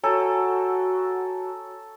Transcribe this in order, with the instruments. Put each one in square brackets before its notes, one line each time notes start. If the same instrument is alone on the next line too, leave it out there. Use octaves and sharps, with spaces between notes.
[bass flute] F#4 [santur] A4 [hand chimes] C#5 G#5 A#5